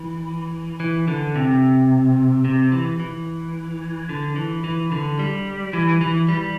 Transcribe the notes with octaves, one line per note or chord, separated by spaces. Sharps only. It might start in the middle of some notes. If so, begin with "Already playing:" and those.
Already playing: E3
E3
D3
C3
C3
E3
E3
D3
E3
E3
D3
G3
E3
E3
G3